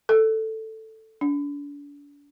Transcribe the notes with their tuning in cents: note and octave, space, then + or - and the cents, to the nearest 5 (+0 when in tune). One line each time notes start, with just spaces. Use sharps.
A4 +5
D4 -40